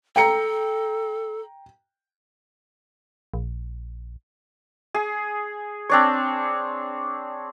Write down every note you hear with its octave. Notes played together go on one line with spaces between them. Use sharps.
A4 G5 A#5 C#7
A#1
G#4
C4 D4 C#5